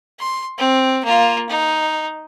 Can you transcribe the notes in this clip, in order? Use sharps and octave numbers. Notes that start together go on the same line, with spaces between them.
C6
C4
A#3 F4
D#4